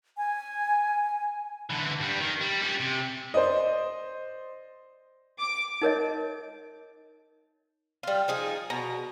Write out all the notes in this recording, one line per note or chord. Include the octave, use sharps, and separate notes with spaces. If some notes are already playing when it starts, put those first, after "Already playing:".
G#5
D3 E3
G2 G3
D#3
G3
G3 C#4
C3
C5 D5 D#5
D6
D#4 A#4 C#5 D#5
G3 F4
F3 D#4 G#4
B2 A#5